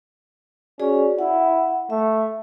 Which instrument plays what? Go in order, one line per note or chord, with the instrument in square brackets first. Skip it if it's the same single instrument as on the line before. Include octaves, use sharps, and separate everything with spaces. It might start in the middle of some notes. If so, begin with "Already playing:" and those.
[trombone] C#4 [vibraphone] F#4 G#4 D5
[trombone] E4 [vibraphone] F#5
[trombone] A3 [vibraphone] E5